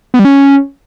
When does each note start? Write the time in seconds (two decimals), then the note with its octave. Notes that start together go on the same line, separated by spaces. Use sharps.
0.14 B3
0.19 G3
0.25 C#4